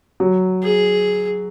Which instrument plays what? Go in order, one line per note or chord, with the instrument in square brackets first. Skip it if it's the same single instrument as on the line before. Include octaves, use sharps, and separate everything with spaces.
[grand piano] F#3
[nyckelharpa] G#4